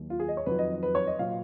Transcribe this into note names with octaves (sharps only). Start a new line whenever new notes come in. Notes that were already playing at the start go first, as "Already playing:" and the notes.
Already playing: D#2 D#3 F#3
F4
G#4
D#5
C#5
F2 D#3 F#3 B4
D#5
B4
C#5
D#5
A#2 F#3 F5